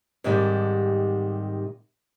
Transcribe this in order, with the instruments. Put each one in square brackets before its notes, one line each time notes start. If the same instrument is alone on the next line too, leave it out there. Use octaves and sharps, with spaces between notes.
[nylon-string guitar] G#2 C3 D#3 G3